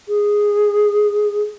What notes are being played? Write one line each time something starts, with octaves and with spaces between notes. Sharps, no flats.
G#4